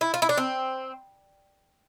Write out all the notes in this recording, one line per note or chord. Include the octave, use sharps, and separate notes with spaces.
E4
F4
E4
D4
C4